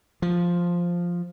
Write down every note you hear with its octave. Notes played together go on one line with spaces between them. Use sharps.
F3